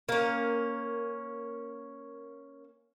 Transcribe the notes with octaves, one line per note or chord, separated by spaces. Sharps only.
A#3 C#4